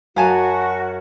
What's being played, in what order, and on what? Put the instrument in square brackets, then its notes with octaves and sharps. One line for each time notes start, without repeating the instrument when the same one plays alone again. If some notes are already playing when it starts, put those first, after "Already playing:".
[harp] F#2 [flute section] F#4 [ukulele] F5 G#5 A5